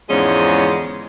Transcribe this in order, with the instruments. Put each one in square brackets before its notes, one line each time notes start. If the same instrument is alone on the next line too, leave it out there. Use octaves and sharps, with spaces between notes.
[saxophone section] E2 G#2 D3 F3 G#3 C#4